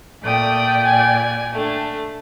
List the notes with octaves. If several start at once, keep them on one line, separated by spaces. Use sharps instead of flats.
A#2 A3 D5 G5 D#6
G#5
A3 D4